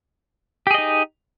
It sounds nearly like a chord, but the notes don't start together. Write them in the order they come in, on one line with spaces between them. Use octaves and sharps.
G4 G#4 D#5 D#4